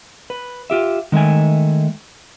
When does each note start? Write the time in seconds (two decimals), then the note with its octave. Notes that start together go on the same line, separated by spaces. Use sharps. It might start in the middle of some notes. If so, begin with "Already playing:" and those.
0.30 B4
0.70 F4 G4 E5
1.12 D#3 G#3 A3 E5 G#5